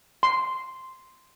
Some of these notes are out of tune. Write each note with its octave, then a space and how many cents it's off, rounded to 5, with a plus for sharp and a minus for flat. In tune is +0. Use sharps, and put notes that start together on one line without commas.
C6 -5